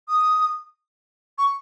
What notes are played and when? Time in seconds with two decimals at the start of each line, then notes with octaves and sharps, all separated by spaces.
0.08 D#6
1.38 C#6